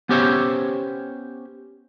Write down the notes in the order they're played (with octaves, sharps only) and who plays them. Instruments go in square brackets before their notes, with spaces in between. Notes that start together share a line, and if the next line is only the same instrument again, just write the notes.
[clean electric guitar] B3 C#4 G4 C5 C#5 E5